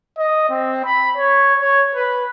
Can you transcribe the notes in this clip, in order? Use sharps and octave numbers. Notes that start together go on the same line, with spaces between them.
D#5
C4
B5
C#5
C#5
B4